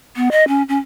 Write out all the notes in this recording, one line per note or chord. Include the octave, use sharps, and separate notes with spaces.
B3
D#5
C#4
C#4